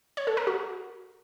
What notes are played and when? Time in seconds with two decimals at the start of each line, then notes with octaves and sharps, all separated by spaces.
0.17 C#5
0.27 A4
0.37 A#4
0.47 F#4